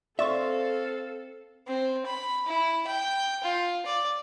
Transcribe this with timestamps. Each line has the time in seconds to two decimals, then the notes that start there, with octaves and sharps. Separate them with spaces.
0.19 C4 A4 D5 E5 F5 C6 C#6
1.68 C4
2.06 B5
2.46 E4
2.87 G5
3.44 F4
3.86 D5